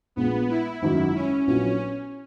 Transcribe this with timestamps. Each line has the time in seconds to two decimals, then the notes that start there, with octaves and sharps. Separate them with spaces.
0.16 A#1 A#2 G#3 B3
0.49 E4
0.82 G#1 F#2 D#3 E4
1.15 C#4
1.47 A#1 A#2 F#3 B3 C#4 E4